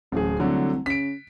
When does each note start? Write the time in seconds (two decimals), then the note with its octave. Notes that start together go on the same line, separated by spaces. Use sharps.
0.12 D1 A1 G#4
0.40 C2 D3 F#3 A3
0.86 C#3 B6 D7